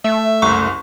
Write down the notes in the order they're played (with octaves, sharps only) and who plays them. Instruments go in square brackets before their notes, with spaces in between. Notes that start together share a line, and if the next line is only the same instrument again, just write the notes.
[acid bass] A3 [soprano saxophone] E5
[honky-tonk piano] F#1 C2 [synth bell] C#6